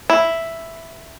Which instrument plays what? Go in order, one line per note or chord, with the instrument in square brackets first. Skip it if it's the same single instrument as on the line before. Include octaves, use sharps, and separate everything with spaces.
[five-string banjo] E4